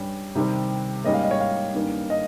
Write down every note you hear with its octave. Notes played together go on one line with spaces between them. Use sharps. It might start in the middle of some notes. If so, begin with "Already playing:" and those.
Already playing: G2 G3 C#4
C3 D#3 G3 C4
G#2 G3 A#3 C#4 D#5
F5
D#5
C#5
F5
G2 D#3 A#3 C#4
D#5